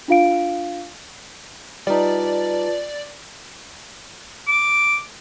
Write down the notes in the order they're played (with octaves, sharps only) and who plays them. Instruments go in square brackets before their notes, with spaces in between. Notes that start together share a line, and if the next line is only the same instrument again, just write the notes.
[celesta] D4 F4 F5 D7
[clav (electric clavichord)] G3 D#4 [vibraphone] F4 B4 A5 [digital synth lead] D5
[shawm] D6